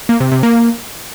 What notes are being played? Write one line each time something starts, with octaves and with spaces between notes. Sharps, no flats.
A#3
C3
C3
A#3